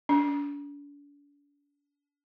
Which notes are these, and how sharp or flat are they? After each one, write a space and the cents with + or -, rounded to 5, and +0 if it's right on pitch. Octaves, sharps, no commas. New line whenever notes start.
D4 -40